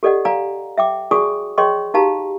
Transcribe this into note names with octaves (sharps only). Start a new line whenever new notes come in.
G4 A4 D5 D#5 F#5
D5 F5 G#5 A#5
E5 G5 D6
F#4 G#4 D5 G#5 C#6 D#6
G#4 C#5 D#5 G5 C6 C#6
D#4 F#4 G4 F5 A5 A#5